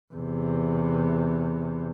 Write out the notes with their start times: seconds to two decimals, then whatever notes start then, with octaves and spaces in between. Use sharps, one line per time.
0.14 E2 C3